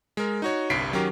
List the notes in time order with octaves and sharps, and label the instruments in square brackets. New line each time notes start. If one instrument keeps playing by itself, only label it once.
[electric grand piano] G#3 A#4
D#4 F#4 C#5
G1 C2 G2 B6 C7 D7
D#3 F#3 C#4 G4 A#4